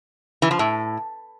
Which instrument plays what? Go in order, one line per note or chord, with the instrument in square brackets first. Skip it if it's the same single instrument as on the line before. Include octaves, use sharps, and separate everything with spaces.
[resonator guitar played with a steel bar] E3
F3
A2